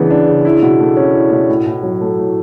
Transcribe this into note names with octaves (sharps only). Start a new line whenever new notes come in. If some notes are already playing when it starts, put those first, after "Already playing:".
Already playing: C#3 E3 B3 D4
D4
C#3
E4
B2
A3
C#4
E4
B2
A2
A2
F#3
A3
A2